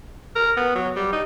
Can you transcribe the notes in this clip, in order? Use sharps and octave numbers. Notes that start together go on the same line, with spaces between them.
A#4
B3
F#3
G3
D#4